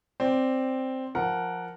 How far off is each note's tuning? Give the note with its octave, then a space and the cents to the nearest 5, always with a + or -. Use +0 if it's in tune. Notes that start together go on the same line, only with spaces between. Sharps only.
C4 +0 D5 +0
F3 +0 A#4 +0 F#5 +0